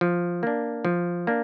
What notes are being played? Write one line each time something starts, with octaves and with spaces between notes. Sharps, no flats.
F3
A#3 D4
F3
A#3 D4